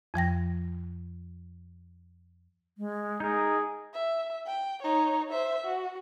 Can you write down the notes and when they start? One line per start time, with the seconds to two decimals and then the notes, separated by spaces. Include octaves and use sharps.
0.14 F2 F3 G5 A#6
2.78 G#3
3.20 D#4 G#4 A#4
3.94 E5
4.47 G5
4.82 D#4 C#5
5.30 C5 E5
5.65 F#4